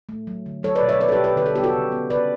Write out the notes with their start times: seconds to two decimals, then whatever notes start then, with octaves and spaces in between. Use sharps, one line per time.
0.09 A3
0.27 F#3
0.46 D3
0.63 F#3 A4 C#5
0.75 B4 D5
0.83 B2
0.89 C#5 E5
1.00 B3 B4 D5
1.08 A4
1.12 G4 B4
1.18 B2
1.24 G4 B4
1.37 D3 B4
1.46 A4
1.55 B3 G4
1.63 F#4 A4
1.73 C#3
1.92 B3
2.10 C#3 B4 D5